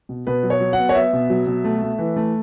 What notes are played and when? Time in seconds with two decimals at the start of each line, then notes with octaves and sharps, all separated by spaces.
0.09 B2
0.27 B2 B4
0.43 F#3
0.50 C#5
0.61 F#3
0.73 B3 F#5
0.89 C#5
0.95 B3 E5
1.13 B2
1.30 F#3
1.47 B2
1.64 A3
1.82 A3
1.99 E3
2.16 A3